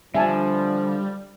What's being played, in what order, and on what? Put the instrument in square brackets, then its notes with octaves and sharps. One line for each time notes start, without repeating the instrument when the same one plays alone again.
[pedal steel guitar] D3 D4 F4 [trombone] F3 [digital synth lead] G3 [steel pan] E5 G#5 A5